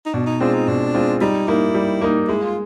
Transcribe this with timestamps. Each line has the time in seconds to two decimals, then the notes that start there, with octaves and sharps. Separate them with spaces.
0.06 D#4
0.14 B2 D4
0.26 D#4
0.40 G#3 C4 D4 F4
0.54 D#4
0.68 B2 D4
0.94 G#3 C4 F4
1.21 G3 D#4
1.48 A#3 D#4 E4
1.74 G3
2.01 A#3 D#4
2.28 G#3 E4
2.42 F4